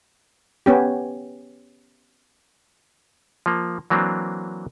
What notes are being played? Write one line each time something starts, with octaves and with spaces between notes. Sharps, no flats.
B3 C#4 G4
F3 A#3
E3 F#3 A#3 C4 D4